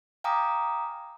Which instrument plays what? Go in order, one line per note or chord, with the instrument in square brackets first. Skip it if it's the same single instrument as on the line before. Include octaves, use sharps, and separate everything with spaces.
[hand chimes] F5 G5 G#5 A#5 D6 D#6